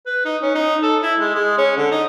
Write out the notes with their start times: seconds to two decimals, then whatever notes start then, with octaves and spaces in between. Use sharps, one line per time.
0.06 B4
0.25 D#4
0.42 C#4
0.55 D#4
0.83 A4
1.03 E4
1.19 G#3
1.35 G#3
1.58 C#4
1.77 D3
1.91 D#4